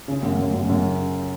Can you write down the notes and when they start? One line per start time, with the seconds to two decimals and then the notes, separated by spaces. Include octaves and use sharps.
0.08 C#3
0.23 F#2
0.39 F#2
0.54 F#2
0.69 F#2
0.85 C#3